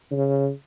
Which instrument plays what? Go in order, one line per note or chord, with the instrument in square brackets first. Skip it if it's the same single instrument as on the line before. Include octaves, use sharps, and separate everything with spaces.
[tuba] C#3